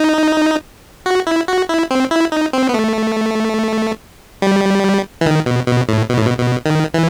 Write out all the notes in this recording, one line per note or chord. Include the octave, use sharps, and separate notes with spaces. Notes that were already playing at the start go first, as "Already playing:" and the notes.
Already playing: D#4
F#4
E4
F#4
E4
C4
E4
D#4
C4
B3
A3
G3
E3
D#3
B2
B2
A2
B2
A2
B2
B2
D#3
E3